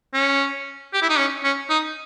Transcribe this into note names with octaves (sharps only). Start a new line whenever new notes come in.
C#4
G4
E4
D#4
C#4
C#4
D#4